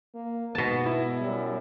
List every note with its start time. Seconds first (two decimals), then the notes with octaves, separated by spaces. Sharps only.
0.15 A#3
0.55 G#2 B2 B3 A5
0.86 E4
1.21 F#2 G3